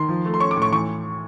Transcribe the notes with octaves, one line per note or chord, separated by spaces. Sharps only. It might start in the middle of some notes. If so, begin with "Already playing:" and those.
Already playing: D#3 C6
F3
A3
C6
C#4 C#6
D6
A2
C#6
E3 C#6